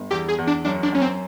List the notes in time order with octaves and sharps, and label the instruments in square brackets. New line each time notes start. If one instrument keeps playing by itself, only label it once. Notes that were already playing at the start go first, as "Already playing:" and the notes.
Already playing: [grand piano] G1
[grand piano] E2 [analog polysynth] G4
[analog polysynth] G#4
[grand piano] E2
[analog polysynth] D4
[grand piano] F#2 [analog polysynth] D4
[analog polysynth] D4
[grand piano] F#2 [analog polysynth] C#4
[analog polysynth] C4